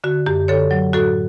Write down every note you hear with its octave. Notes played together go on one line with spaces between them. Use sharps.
D3 F#4
F#2 G4
D3 A4 C#5
F#3
A2 F#4 A4